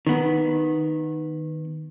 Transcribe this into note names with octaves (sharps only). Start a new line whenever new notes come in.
D#3 B3